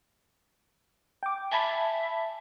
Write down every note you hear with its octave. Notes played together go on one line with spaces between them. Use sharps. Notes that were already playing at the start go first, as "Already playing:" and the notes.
G5 D6
E5 G#5 A5 B5